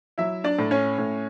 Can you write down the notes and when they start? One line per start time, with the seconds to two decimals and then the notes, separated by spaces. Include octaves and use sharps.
0.18 F#3 E4 E5
0.44 D4 D5
0.59 A2
0.71 C#4 C#5
0.98 A2